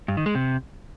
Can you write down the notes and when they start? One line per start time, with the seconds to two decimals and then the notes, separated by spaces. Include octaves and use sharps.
0.08 G2
0.17 D#3
0.26 G#3
0.35 C3